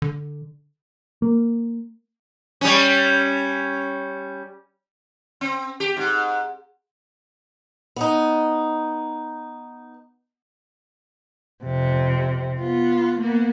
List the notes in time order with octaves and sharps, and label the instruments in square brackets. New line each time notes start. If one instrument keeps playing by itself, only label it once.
[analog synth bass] D3
[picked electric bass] A#3
[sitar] G3 C#4
C4
G4
G#2
[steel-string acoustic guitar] B3 D#4
[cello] F2 C3
B3 F4
A#3 B3